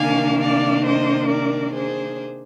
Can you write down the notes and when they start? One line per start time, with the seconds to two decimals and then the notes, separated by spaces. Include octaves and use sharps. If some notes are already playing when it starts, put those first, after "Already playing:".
Already playing: C3 D#3 A#3 D4 F5 G#5
0.41 D5 F5
0.85 C5 D#5
1.29 A#4 D5
1.73 G#4 C5